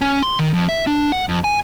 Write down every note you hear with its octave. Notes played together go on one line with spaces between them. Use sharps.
C#4
C6
D#3
F2
E5
D4
F#5
F2
G#5